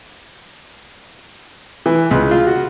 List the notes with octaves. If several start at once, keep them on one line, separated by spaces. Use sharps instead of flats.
E3
C#2
F4
F#4